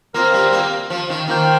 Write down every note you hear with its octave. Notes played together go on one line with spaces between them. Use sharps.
A#3 C4 F4 A#4
G3
A#3
F3
D#3
D#3 A#3 F4 C5 G5